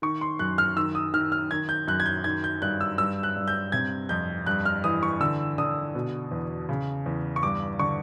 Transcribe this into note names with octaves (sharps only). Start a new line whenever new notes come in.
D#3 C#6
C6
F#2 F#6
F6
D#3 E6
D#6
D#3 F6
F6
D#3 G#6
G6
F#2 F#6
G#6
G6
D#3 G#6
G6
G2 F#6
E6
G2 E6
F#6
G2
G6
C3 G#6
F2 G6
G2 F#6
F6
E3 D#6
C#6
D3 E6
D3 D#6
B2
E2
C#3
E2
C#6
G2 D6
D3 C#6